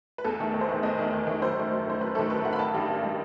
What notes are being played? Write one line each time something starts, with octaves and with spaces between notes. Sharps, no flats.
B4
E2 A4
D#3 A3
E2
C5
D#3 A3 B4
E2 D#5
D#3 A3
E2
D#3 A3
F#2 C5
D#3 A3
F#2
D#3 A3 C5
F#2 B4
D#3 A3 A4
F#2 B4
D#3 A3 F#5
B5
A1 A5
G2 D#3 G3
A1
D#3 G3